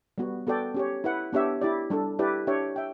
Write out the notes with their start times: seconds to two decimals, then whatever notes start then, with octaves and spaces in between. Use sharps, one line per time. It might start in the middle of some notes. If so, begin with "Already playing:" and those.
0.18 G3 B3 F#4
0.47 B3 F#4 A4 D5 G5
0.74 C#4 G4 C#5
1.04 E4 B4 F#5
1.33 B3 D4 G4 C#5 E5
1.62 E4 G4 D5
1.90 G3 D4 A4
2.19 E4 G4 B4 D5
2.47 D4 G4 C#5 E5 G5
2.76 E5 G5